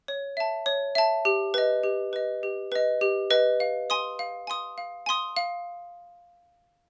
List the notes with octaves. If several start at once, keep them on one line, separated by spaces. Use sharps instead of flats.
C#5
E5 A5
C#5
E5 A5
G4
B4 D#5
G4
B4 D#5
G4
B4 D#5
G4
B4 D#5
F5
G#5 C6 D#6
F5
G#5 C6 D#6
F5
G#5 C6 D#6
F5